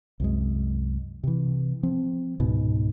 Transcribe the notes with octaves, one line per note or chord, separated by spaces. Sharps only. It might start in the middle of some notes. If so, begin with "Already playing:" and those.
C2 F#2 G#3
C3 E3
F3 C4
C#2 G#2 B2